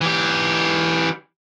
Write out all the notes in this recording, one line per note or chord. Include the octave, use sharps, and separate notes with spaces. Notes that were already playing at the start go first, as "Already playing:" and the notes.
E3 G4